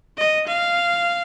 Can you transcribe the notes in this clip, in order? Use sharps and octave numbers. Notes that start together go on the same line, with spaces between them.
D#5
F5